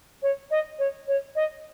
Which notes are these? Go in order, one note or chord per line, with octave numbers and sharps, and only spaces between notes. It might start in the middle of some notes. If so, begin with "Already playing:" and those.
C#5
D#5
C#5
C#5
D#5